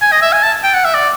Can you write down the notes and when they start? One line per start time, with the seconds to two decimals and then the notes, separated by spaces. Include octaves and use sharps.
0.02 G#5
0.12 D#5
0.22 E5
0.33 G#5
0.43 A5
0.63 G5
0.74 F#5
0.85 E5
0.94 D5